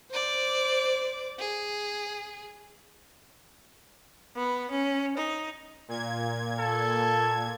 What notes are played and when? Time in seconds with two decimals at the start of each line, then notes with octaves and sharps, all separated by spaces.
0.10 C5 D5
1.39 G#4
4.35 B3
4.70 C#4
5.17 D#4
5.88 A#2 G#6
6.59 A4